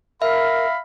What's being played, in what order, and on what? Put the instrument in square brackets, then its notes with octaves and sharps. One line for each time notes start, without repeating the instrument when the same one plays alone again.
[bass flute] A#4 [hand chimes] E5 [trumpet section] F5 B5